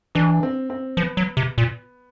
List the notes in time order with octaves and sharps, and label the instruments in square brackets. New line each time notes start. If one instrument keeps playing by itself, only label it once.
[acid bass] E3 [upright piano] D4
[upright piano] C4
C4
[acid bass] F3 [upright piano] B3
[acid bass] F#3
C3
A#2